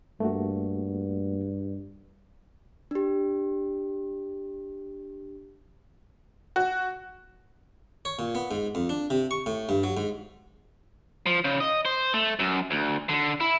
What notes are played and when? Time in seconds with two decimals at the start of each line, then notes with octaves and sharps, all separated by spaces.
0.20 G2 A3 A#3 F#4
2.91 D4 G4
6.56 F#4
8.05 C#5
8.19 A#2
8.35 B3
8.51 G#2
8.75 F2
8.89 D4
9.10 C3
9.31 C#6
9.46 A2
9.69 G2
9.83 F#3
9.97 G#2
11.26 F3
11.44 C#3
11.61 D#5
11.85 C5
12.14 A3
12.40 F#2
12.71 D2
13.09 D3
13.40 E4